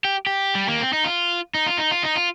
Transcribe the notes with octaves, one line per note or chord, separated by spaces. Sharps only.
G4
G4
G3
A#3
C4
D#4
F4
D#4
F4
D#4
F4
D#4
F4